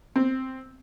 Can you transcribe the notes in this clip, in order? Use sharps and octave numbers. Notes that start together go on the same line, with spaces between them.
C4